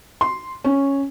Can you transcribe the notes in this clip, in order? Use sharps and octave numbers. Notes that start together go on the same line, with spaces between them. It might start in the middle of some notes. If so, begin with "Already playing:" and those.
C6
C#4